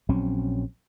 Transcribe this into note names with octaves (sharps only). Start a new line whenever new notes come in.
A#1 F#3 C4 C#4